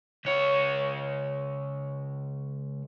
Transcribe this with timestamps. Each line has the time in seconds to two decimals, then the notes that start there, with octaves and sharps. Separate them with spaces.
0.25 C#2 C#5